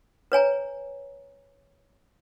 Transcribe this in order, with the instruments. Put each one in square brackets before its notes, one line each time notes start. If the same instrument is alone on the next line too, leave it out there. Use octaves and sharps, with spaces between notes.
[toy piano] B4 C#5 G#5 A#5